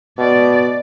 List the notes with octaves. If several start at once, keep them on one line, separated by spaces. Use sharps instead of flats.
B2 D5